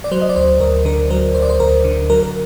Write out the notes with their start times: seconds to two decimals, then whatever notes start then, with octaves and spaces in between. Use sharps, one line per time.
0.04 D5
0.11 F#3 C5
0.22 D#5
0.29 D5
0.36 D2 C5
0.60 D2 A#4
0.85 D3 A#4
1.10 F#3 A#4
1.34 D2 C5
1.42 D5
1.50 C5
1.60 D2 A#4
1.84 D3
2.10 F#3 A#4
2.23 A#4